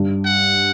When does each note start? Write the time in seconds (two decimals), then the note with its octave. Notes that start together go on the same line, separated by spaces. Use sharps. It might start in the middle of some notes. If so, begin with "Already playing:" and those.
Already playing: G2
0.26 F#5